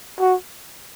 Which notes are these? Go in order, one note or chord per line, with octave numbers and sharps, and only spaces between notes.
F#4